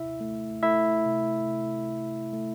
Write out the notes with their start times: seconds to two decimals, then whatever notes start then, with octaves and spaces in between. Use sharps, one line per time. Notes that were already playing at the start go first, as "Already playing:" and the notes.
Already playing: C3 E4 E5
0.21 A3
0.63 A3 E4 E5
1.06 C3
1.47 C3
1.90 A3
2.33 A3